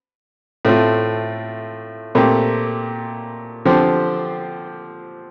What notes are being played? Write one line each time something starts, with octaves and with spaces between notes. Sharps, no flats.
A2 A3 C4 F4
A#2 A3 C4 G4
D3 F3 C4 G4 C5